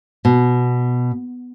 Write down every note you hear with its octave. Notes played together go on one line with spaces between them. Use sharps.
B2